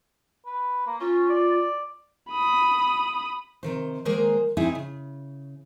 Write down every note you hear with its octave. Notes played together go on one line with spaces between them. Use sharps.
B4
A#3
C#4 F4
D5
B5 D#6
C3 D#3 C5
D#3 G#3 A#3 G#4 A#4 C5
C4 D#4 E4 G#4
C#3